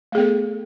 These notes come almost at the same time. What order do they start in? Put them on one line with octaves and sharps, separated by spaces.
A3 G#4 B3 A4